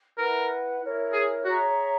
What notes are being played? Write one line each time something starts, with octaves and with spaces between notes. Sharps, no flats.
E4 A#4 B4 F#5
E4 A#4 C#5
G#4
F#4 G#4 C#5 E5 A#5